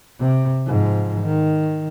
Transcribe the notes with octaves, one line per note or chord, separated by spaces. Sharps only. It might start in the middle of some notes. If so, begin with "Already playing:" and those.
C3
G#2 F3
D#3